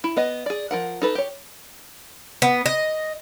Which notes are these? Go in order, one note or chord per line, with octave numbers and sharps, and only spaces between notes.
E4
B3 D#5
G#4 D5
F3 A#4 F#5
D#4 A4 B4
G4 C#5
B3
D#5